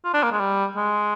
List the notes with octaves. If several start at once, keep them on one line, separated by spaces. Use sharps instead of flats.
F4
D4
A#3
G#3
G3
G#3